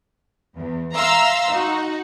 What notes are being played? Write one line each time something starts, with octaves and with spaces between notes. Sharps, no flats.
E2
E5 F5 A#5 C6 E6
D#4 F#4